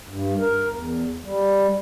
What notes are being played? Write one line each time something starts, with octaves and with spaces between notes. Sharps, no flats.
G2
A#4
E2
G3